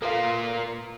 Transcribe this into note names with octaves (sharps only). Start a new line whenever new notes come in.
A#3 F4 A4 B4 F5